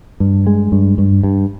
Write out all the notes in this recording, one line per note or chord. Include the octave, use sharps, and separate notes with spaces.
G2
G#3
G2
G2
G2